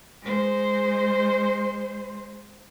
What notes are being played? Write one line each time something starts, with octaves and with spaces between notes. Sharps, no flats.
G#3 C5